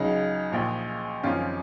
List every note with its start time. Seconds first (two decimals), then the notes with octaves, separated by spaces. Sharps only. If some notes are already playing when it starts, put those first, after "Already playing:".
Already playing: C#2 C#3 F#3 D#4
0.51 A#1 A#2 F3
1.23 G#1 F#2 F3 C#4 F4